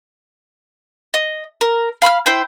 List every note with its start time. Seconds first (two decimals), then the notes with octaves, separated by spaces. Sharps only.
1.14 D#5
1.61 A#4
2.02 F5 B5 C6 F6
2.26 E4 C5 G5